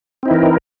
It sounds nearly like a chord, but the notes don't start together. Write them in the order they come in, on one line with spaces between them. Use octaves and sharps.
C4 D#4 E4 E3 A#4